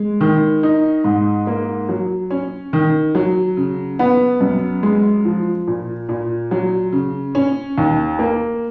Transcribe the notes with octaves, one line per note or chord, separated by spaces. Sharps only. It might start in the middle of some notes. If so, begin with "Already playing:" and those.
Already playing: G#3
D#3
D#4
G#2
A#3
F#3
C#4
D#3
F#3
C#3
B3
F#2
G#3
F3
A#2
A#2
F#3
C#3
C#4
D#2
A#3